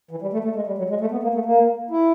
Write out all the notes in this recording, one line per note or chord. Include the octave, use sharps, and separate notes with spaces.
E3
G3
A3
A3
G#3
G3
F#3
G#3
A3
B3
A#3
A3
A#3
E4